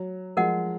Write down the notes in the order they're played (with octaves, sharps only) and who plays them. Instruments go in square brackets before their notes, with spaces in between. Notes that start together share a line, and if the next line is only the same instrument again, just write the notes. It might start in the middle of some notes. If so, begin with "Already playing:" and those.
Already playing: [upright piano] F#3
[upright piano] F3 G#3 [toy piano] A#4 D#5 F#5